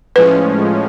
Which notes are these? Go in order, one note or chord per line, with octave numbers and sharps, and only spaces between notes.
A2 F3 G#3 C#4 B4